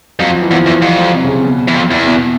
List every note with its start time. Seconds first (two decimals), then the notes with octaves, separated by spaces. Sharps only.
0.20 F2 F#3
0.31 F3
0.42 E3
0.51 E2 F3
0.66 E2
0.82 F2 G3
0.98 F#3
1.13 C3
1.24 C#3
1.29 C3
1.44 B2
1.68 E2
1.75 F2
1.91 E2
2.06 B2
2.17 B2